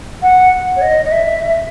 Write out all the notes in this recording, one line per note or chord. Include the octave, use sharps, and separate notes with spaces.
F#5
C#5
D#5
D#5
E5